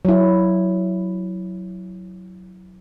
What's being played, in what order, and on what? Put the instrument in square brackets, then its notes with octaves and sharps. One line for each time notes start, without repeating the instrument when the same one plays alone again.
[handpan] F#3 E4